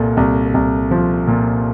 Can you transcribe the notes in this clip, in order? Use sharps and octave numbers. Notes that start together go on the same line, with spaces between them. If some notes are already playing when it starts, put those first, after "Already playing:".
Already playing: C2 A#2 A4
C2
C2
F3
A#2